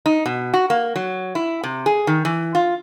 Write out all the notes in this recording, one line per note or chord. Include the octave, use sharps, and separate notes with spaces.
D#4
B2
F#4
A#3
F#3
E4
C3
G#4
D#3
E3
F4